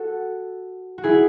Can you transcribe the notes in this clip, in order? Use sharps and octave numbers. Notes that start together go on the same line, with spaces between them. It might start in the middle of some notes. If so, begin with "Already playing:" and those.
Already playing: F#4 A4
F#4
E4 G#4